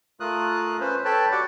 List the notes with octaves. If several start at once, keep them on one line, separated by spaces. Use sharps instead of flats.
A3 F4 A#4 D#6 F#6
C#4 B4 C5
A4 B4 C#5 G5 A5 B5
F#4 G4 D5 F#5 D6